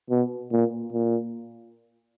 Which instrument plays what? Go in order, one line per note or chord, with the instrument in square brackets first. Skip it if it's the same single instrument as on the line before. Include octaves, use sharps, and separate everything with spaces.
[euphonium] B2
A#2
A#2